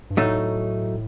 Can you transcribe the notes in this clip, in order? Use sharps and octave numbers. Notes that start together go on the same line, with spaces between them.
G2
A2 F#3 A3 D#4